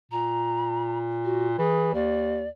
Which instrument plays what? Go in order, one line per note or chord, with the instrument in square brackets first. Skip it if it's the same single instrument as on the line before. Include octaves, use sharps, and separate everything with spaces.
[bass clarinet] A#2 [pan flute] A#5
[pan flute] F#4
[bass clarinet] E3 [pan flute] G#4
[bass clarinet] D#2 [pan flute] D5